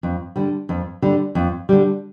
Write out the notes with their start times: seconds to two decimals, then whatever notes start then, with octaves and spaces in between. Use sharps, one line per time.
0.03 F2
0.36 D3 G3
0.69 F2
1.02 D3 G3
1.35 F2
1.69 D3 G3